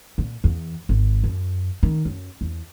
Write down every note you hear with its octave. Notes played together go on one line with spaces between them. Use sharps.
A#2
E2
G#1
F#2
D#3
F#2
E2